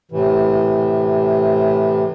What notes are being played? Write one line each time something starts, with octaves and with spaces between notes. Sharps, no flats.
A2 C3 E3